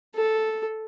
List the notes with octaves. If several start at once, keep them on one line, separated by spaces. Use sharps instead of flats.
A4